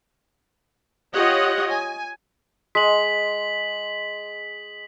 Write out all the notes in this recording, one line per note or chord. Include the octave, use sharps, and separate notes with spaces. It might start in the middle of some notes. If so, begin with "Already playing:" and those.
F4 G4 C#5 D#5 F#5
G#5
G#3 B6 F#7